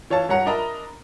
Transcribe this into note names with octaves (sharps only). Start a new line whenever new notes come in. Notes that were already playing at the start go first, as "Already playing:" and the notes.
E3 C#5 F5 A5
G2 C#5 F#5 A#5
D4 A#4 D#5 E5 A#5 B5